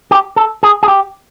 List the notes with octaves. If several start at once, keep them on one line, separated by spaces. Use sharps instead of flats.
G4
A4
G#4
G#4
G4